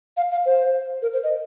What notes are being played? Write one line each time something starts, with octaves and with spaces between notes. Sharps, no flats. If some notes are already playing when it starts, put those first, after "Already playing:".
F5
F5
C5
A#4
C5
D#5